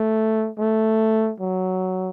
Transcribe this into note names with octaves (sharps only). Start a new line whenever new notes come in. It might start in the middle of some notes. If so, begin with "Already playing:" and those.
Already playing: A3
A3
F#3